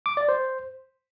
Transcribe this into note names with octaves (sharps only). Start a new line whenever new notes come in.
D6
D5
C5